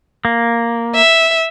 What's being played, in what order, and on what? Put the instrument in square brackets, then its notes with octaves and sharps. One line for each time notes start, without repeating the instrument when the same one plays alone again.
[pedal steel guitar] A#3
[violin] E5